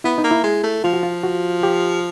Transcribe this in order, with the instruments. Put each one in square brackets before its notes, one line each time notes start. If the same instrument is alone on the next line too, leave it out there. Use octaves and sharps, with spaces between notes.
[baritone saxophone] B3 [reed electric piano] E4
[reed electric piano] D#4
[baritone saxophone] A#3
[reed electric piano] E4
[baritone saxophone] G#3
A3
[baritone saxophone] F3 [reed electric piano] F4
[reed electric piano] F#4
F4
F#4
G4